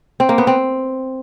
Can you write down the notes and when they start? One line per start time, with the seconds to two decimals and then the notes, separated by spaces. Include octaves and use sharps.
0.20 C4
0.29 A#3
0.38 B3
0.47 C4